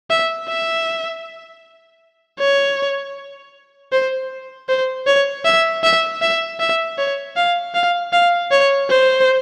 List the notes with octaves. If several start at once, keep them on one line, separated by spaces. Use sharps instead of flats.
E5
E5
C#5
C5
C5
C#5
E5
E5
E5
E5
C#5
F5
F5
F5
C#5
C5